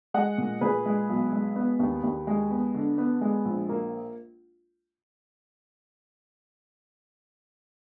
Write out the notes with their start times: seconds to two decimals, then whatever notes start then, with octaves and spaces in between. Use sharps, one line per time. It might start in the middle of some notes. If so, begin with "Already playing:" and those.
0.14 G#3 D#5 F#5
0.38 A#2
0.61 A#2 G#4 B4
0.86 G#3
1.09 B1
1.33 G#3
1.56 B3
1.79 D#2
2.03 D#2
2.27 G#3
2.50 B3
2.74 D3
2.98 B3
3.21 G#3
3.45 A#1
3.69 A#3